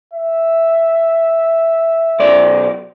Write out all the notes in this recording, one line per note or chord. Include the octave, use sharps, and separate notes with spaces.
E5
B1 D5